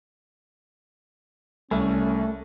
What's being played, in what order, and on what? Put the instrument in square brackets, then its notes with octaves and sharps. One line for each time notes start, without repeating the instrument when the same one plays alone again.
[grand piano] C2 [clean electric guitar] A3 [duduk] C#4